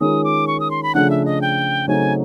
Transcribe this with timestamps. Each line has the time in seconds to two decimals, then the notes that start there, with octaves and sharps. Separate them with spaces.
0.01 D#3 G#3 C#4 F4 A#4 D#6
0.24 D6
0.47 C#6
0.60 D#6
0.71 C6
0.83 B5
0.95 C#3 F3 A3 D4 F#5
1.10 E5
1.25 D#5
1.41 G5
1.88 C#3 F#3 A3 C4 D#4 G#5